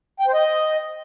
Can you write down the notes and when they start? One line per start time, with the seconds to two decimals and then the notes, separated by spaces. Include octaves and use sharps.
0.20 G5
0.27 C5
0.34 D#5